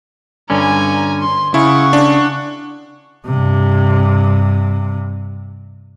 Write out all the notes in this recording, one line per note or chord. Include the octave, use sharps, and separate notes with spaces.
G2 D3 C#4 G#5 A#5
C6
C#3 E4 F#5 C#6
D4
G2 C3